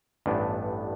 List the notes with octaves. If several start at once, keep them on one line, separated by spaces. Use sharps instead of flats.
A1 G2 E3 B3 D4